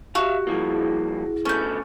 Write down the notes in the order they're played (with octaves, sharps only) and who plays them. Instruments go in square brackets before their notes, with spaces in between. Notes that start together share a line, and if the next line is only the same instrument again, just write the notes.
[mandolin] F#4 [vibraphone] G4 [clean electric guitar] E5 F5
[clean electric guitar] G2 F3 A#3 [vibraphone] E4 G#4
[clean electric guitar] D3 A3 B3 [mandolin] C#4 G6